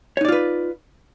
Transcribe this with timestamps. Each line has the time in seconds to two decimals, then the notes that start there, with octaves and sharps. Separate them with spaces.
0.17 C#5
0.21 D#4
0.25 D5
0.28 F4
0.32 B4